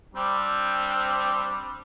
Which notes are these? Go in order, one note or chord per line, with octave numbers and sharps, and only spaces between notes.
G3 C4 D4